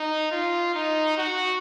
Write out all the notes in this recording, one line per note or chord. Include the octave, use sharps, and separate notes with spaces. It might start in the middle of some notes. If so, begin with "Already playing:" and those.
Already playing: D#4
F4
D#4
F#4